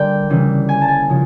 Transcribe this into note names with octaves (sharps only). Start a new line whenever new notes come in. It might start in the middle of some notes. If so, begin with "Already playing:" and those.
Already playing: D3 G3 A#3 G5
C#3 E3 G3
G#5
A5
G#5
C#3 F3